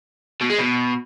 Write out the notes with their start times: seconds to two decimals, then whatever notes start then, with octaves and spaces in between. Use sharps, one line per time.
0.41 B2
0.50 G#3
0.59 B2